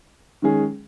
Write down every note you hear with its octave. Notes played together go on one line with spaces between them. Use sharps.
D#3 G#3 C#4 G#4